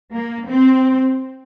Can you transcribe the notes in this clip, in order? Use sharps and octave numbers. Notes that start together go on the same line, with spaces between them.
A#3
C4